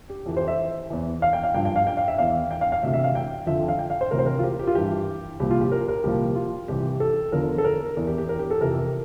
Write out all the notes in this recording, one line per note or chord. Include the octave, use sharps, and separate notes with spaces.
G4
F2 E3
C5
E5
E2 E3
F5
G5
F5
G2 F3 G5
G5
F5
G5
F5
E5
E2 E3 F5
G5
F5
F5
D2 C3 E3 E5
E5
F5
G5
F2 D3 F3 E5
F5
G5
F5
C5
D2 C3 E3 A#4
C5
A#4
F4
G4
G4
F4
G2 E3 G4
C2 A#2 F3 G4
F4
G4
A#4
A#4
C2 A#2 F3 G4
F4
C2 C3 E3 G4
A4
E2 D3 F3 A#4
A4
A#4
E2 E3
G4
G4
A#4
G4
A4
F2 C3 E3 A#4